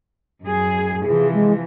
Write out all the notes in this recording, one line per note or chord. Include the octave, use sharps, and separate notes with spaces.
F#2 G#4
C3 E3 F3 G#4
G#3